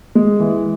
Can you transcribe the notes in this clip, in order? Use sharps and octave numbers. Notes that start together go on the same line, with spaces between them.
G#3
E3